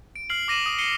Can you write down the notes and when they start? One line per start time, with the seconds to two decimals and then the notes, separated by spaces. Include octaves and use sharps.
0.16 D7
0.30 F6 C7 F#7
0.48 D6 A#6 D#7 E7 F#7
0.66 D#6
0.78 C7 C#7 D#7 G7